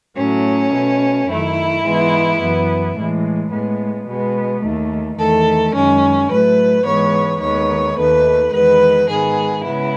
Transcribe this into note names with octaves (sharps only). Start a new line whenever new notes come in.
A2 F#3 A3 C#4
B2 A3
F#2 D#3 A3 E4
G#2 E3 G#3 B3
F#2 E3 B3
A2 E3 G#3
A2 G#3 B3
B2 G#3 B3
D#2 D#3 A3
E2 D#3 A3 A4
F#2 D#3 G#3 C#4
A2 F#3 A3 B4
G#2 E3 G#3 B3 C#5
D#2 D#3 G#3 B3 C#5
D#2 D#3 A3 B4
E2 D#3 G#3 B3 B4
G#2 D#3 G#3 B3 G#4
C#3 G#3 B3 E4